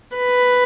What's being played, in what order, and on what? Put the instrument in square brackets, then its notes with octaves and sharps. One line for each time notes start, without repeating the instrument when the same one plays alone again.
[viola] B4